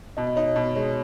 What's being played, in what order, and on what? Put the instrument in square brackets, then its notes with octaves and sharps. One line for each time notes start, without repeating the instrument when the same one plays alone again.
[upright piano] B2 [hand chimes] D#5
[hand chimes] D#5
[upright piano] D#4 [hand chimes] C#5
[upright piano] B2
[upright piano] G#3 [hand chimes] C#5